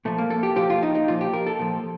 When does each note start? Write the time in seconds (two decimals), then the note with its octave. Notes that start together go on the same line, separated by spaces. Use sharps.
0.05 A#2 F3 A3
0.18 A#3
0.30 A4
0.43 G4
0.56 A#2 F3 G4
0.70 F4
0.83 D#4
0.95 D#4
1.08 A#2 F3 F4
1.21 G4
1.33 A#4
1.47 A4
1.59 A#2 F3